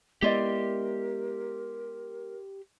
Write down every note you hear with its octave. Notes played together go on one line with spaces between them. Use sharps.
G#3 B3 E4 G4 A#4 D5 D#5 C6